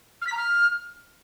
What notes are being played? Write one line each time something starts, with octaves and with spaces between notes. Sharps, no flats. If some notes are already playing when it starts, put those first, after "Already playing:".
F6
B6
A#5
F6